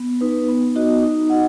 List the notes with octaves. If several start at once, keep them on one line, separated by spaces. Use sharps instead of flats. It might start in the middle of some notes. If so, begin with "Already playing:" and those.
Already playing: B3
D#4 B4
B3
D#4 F#4 D#5
D#4
F#4 D#5 F#5